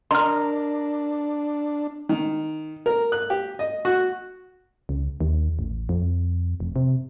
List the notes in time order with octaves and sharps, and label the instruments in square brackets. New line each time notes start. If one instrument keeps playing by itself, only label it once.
[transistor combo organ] D4 [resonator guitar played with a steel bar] A#4 D#5 A#5 [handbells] C6 F6
[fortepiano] D#3
A#4
F#6
G4
D#5
F#4
[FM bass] C#2
D#2
A1
F2
F1
C3